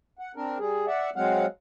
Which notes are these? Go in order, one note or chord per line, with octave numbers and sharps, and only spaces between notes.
F#5
C4 D4 A#4
G3 G#4
D5 E5 F#5
F#3 G#3 C4 F5 F#5